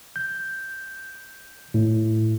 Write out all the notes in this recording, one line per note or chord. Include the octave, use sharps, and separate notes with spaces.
G6
A2